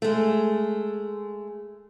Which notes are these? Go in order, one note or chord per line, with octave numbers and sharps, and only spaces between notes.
G#3 A3